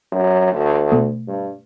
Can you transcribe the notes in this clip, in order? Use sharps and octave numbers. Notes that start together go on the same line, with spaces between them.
F#2
D2
B2 A3
G2